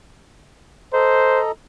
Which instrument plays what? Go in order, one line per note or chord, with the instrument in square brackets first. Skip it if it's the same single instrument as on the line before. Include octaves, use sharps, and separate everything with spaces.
[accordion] A4 D#5 A#5 [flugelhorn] C5